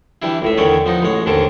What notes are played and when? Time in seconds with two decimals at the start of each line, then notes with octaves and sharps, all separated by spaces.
0.22 E3 G3 D4 E4
0.42 C#2 A2 E5
0.57 E2 D3 D#3 C#4 C#5 D5
0.86 F3 B3 D#4
1.03 A1 G#3 C#5
1.26 D#2 G#2 D3 C#4 A5 D6